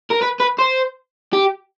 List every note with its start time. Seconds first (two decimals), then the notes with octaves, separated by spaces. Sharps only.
0.10 A#4
0.21 B4
0.40 B4
0.59 C5
1.33 G4